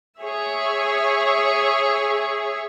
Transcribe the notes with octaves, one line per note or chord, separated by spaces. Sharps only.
G#4 C#5 E5